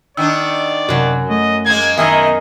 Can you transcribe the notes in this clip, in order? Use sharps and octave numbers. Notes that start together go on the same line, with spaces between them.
D#3 B3 D4 D5 E6
F#2 C3 F#3 F#4
A3 D#5
G#3 A#3 G#6
B2 D#3 B3 E4 G#4 A#4 D#5 E5